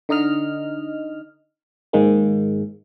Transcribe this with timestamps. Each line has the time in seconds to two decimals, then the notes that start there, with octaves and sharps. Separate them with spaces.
0.09 D3 D#4 D#5 F6
1.93 G#2 D#3 G#3 A#3